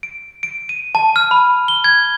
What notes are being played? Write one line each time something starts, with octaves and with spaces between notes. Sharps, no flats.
D7
D7
D#7
A5
F6
B5
G7
G#6